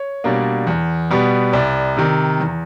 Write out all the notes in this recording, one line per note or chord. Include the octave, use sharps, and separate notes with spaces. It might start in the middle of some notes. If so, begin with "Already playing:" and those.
Already playing: C#5
B2 G3 A#3 D4
E2
B2 G3 B3
C2 D5
C3 D#3
E2